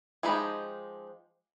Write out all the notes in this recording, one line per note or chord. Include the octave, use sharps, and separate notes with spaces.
F3 G#3 D#4 G4 B5